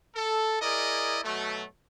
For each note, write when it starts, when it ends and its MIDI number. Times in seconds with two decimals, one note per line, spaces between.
0.16 0.61 69
0.61 1.19 64
0.61 1.19 68
0.61 1.19 70
0.61 1.19 74
0.61 1.19 75
1.25 1.64 47
1.25 1.64 54
1.25 1.64 57